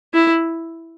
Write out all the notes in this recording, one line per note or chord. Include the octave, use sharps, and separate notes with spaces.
E4